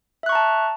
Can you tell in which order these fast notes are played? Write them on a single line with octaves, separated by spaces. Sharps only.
E5 F#6 C#6 A#5 A5